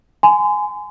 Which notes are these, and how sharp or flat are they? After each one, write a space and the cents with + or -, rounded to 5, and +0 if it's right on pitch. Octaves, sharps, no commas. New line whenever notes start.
G#5 +10 C6 -35